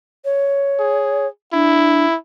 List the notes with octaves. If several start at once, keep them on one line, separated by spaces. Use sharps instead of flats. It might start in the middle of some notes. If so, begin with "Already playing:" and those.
C#5
G#4
D4 E4